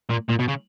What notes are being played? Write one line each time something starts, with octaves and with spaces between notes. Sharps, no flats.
A#2
A#2
B2
C#3